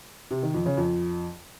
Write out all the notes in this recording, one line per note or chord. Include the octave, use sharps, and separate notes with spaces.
C3
D#3
F2
C#3
F2